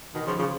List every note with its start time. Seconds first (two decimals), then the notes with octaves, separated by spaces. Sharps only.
0.14 B2 D#3
0.26 C#3 F3
0.39 C#3 F3